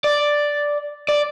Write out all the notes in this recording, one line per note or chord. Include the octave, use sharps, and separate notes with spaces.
D5
D5